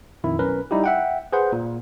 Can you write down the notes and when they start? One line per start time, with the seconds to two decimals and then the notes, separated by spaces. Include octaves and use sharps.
0.24 F2 A#2 D#3 E4
0.39 B1 C#4 A#4 B4
0.71 G3 D#4 E4 G4
0.84 E5 F#5 G5
1.33 G#4 B4 C5 F#5
1.52 A#2